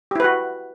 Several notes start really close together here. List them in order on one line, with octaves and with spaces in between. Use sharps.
G4 E4 B4 F#4